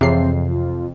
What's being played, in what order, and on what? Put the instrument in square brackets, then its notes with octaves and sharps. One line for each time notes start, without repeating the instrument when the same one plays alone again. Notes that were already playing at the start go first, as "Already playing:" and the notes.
[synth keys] F2 [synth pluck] C3 C7 [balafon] E3 G#4 E5 [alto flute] C4
[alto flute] F4